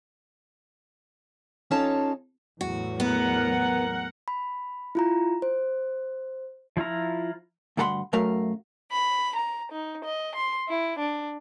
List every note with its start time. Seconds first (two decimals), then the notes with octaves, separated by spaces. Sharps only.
1.71 C#4 D#4 F4 A4 C#5 A5
2.61 E2 A2 F#3 F#4
3.00 B3 A#4 F#5
4.28 B5
4.95 E4 F4 A#5
5.42 C5
6.77 F3 E4 F4 A#5
7.77 D2 G2 A4 F#5 B5 C6
8.13 F#2 F#3 A3 A#4 F5
8.90 B5
9.34 A#5
9.71 D#4
10.03 D#5
10.34 C6
10.68 E4
10.98 D4